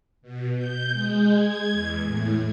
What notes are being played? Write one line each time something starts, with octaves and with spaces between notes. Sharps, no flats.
B2
G6
G#3
G#6
E2
A2